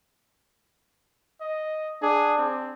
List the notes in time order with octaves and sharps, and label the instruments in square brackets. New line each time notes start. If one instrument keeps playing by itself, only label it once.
[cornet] D#5
[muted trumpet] D4 [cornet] G#4
[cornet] C4